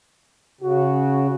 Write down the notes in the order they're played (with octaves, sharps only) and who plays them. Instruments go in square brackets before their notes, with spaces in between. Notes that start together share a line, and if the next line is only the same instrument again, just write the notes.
[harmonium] C#3 [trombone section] F#4